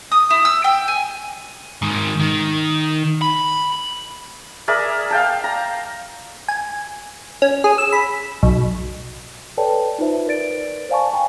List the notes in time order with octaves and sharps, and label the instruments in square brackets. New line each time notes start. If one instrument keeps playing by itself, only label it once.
[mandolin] D#6
E4
E6
G5
G#5
[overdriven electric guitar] G#2 D#3
D#3
B5
[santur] G#4 A#4 D5 E5
F5 G5 A5
A#5
[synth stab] G#5
C#4
G#4
E6
B5
B1
[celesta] A4 B4 C#5 D5 G5 A5
D#4 F4 B4 C5 E5
A#4 B4 D5 A6 D7
C5 D5 F5 G#5 A5 C#6
G5 G#5 A#5